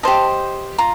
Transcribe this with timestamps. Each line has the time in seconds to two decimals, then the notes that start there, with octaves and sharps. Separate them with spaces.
0.03 G4 C5 D#5 A5
0.78 F4 A#5